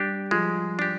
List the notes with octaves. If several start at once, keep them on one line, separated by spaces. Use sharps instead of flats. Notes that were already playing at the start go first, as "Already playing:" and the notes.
Already playing: G3 D4 G4
F3 G#3
D4 G4